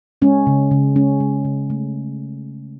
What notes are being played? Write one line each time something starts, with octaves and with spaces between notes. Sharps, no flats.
G#3 C#4
C#3
C#3
G#3 C#4
G#3
C#3
A3